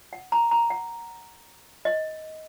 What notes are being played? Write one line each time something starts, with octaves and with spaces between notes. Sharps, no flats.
F#5
A#5
A#5
F#5
D#5